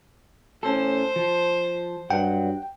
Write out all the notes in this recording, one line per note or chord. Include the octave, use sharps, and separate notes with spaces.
A2 C#4 A4 C5
F3
G2 F#3 F#5 G5